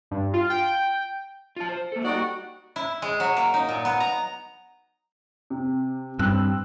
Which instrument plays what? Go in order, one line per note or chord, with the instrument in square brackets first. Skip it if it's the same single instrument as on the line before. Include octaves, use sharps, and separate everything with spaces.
[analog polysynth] G2
F4
G5
[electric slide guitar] F4 A5
C5
A#3 A4
[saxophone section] G3 D#4 F#4 [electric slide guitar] D5 G5
[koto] E4
G#3
F#3
A#3
D#4
A#2
B3
A#5
[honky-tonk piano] C3
[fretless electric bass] G2 [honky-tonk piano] C4 E6 F#6